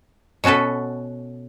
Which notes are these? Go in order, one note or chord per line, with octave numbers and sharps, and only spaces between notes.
B2 C#4 F#4 A4 B4